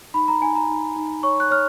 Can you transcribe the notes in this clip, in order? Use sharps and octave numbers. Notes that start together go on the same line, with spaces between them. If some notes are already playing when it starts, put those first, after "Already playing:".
D#4 B5
A#5
D#4 G#5
A#5
D#4
D#4
C#5 C#6
F#6
C#5 F6